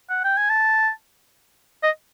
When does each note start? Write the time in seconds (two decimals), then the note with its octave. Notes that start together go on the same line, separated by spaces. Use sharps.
0.10 F#5
0.24 G5
0.37 G#5
0.50 A5
1.83 D#5